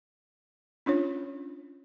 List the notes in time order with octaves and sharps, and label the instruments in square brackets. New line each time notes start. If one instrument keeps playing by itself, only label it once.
[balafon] C#4 D4 F4 C#5